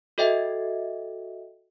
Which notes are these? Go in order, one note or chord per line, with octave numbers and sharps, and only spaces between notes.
F#4 A4 D#5 E5 G5